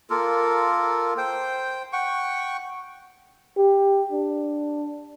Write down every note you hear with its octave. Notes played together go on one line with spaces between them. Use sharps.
A#3 F4 A4 A#4
C5 G5
F#5 G5 C#6
G4
D4